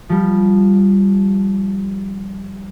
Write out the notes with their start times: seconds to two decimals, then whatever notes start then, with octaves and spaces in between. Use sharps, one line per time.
0.09 F3 G3